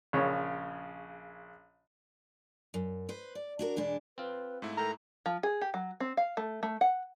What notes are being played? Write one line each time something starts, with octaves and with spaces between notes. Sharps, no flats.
A#1 C#3 C#5
F#2
B4 C5
D5
D4 F#4 A#4
E2 B2 G#3 D4
C4 F4 B4
G#2 A3 E4
A4 A#4 G5 A#5
F3
G#4
G4
F#3
C4
F5
A3
A3
F#5